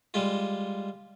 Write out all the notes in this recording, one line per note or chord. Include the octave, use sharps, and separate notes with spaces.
G3 G#3 F4